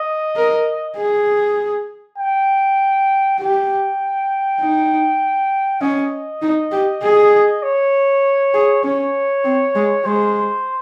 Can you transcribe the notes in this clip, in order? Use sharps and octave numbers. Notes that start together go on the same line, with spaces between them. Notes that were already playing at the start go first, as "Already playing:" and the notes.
Already playing: D#5
A#4
G#4
G5
G4 G5
D#4
C#4 D#5
D#4
G4
G#4
C#5
G#4
C#4 C#5
C4
G#3
G#3 C5